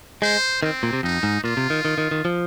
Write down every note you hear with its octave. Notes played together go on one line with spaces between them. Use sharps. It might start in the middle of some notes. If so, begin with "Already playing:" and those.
G#3 C5
D#3 C4
A#2
C3
F2 D#4
G#2
A#2 F4
C3
D#3
D#3
D#3
D#3
F3